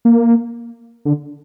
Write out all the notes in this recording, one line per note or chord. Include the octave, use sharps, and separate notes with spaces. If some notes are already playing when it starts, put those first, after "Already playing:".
A#3
D3